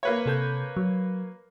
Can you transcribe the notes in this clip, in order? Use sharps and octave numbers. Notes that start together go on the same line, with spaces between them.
A#3 B4 C#5
C3 A4 G6
F#3